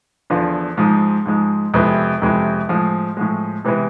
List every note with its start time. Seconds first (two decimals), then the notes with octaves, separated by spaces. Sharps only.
0.30 E2 D3 F3 B3 F4
0.77 G#2 F3 G#3
1.26 G#2 F3 G#3
1.74 F2 C3 G#3 B3 E4
2.22 F2 C3 G#3 B3 E4
2.69 A2 F3 G#3
3.17 A2 F3 G#3
3.64 C3 E3 G#3 B3 E4